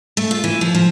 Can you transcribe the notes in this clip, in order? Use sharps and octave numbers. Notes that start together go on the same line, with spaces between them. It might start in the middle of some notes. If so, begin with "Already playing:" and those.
A3
F4
E3
F3
F3